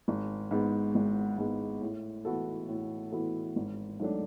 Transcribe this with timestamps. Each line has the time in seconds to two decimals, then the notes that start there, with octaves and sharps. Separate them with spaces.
0.08 G#1
0.51 G#2 G#3 B3
0.95 G#1
1.38 G#2 G#3 B3
1.81 A2
2.25 E3 B3 F#4 A4
2.69 A2
3.12 E3 B3 F#4 A4
3.56 G#1
4.00 G#2 F#3 A3 D4